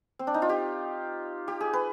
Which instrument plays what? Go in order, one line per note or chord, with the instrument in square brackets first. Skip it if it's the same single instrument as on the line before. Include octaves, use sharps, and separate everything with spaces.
[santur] C4
D4
D#4
F4
G4
G4
G#4
B4